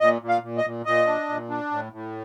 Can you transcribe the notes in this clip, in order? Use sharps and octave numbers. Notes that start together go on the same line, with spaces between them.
A#2 D#5
A#2
F5
A#2
D#5
A#2
A#2 D#5
D4
A#2
D4
A2
A2